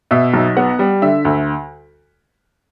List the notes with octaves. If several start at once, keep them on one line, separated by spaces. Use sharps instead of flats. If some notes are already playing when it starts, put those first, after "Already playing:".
B2 E5
B1
B3 F#5
G3
D3 E5
D2